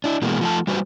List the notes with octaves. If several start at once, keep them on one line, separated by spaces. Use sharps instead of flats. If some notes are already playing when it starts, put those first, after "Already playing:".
D4 E4
B2 E3 G#3 A#3
F3 A3 A5
G3 F#4 B4 C5